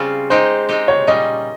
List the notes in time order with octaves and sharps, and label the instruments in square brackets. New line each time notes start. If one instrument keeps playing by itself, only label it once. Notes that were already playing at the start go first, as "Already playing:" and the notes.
Already playing: [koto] C#3 G3 C4 F4
[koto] G#3 C4 D#4 G4 [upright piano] C5
[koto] G#3 C4 D#4 G4
[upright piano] C#5
[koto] A#2 G3 C#4 [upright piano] D#5